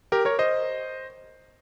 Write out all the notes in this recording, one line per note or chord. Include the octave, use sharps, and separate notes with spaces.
G4 A#4
A#4 C#5
C5 D#5